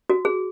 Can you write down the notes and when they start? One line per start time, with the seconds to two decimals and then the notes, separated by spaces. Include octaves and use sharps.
0.10 F#4
0.25 G#4